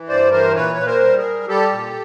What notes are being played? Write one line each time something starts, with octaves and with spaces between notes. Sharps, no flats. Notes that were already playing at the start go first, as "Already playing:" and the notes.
Already playing: E3
G2 C5 D5
E3 A#4 C5
A#2 B4 C#5
A#2 B4
A#4 C5
G3
G#4 A#4
G3
G3 G4 A4
A#2